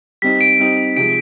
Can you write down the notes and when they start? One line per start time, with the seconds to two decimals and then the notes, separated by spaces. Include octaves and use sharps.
0.22 G3 C4 D#4 B6
0.41 D7
0.59 G3 C4 D#4
0.97 C3 F3 G#3 D7